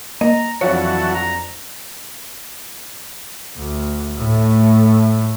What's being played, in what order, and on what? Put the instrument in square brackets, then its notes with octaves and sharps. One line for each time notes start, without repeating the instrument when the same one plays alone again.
[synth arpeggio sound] A#3 D#5 [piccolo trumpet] A#5
[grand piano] F2 D4 F4 [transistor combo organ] E3 F#3 F#4 [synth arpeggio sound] C#5 [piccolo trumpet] A5
[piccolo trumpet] A#5
[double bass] D2
A2 A3